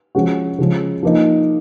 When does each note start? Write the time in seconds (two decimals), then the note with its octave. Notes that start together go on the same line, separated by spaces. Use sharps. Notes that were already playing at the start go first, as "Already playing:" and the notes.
0.15 F3 G#3 C#4 F#4
0.59 C#3 F3 G#3
1.03 F3 A#3 D#4